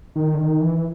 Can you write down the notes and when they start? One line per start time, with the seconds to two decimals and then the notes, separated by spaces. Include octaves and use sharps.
0.16 D#3
0.34 D3
0.38 D#3
0.61 E3